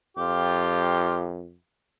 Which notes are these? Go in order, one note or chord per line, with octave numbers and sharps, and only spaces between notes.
F2 F4 G4